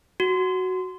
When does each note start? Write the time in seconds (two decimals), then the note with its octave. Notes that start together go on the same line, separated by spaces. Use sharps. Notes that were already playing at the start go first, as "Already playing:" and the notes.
0.20 F#4